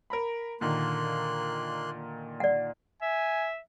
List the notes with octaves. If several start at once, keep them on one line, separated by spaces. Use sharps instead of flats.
A#4 A#5 B5
A#2 D3 D#3 A#3 C6 F#6
D5 F#5
E5 G#5